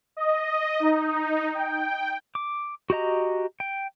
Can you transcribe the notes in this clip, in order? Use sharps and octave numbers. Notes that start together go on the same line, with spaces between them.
D#5
D#4
G5
D6
F#4 G4 D#5 A#5
G5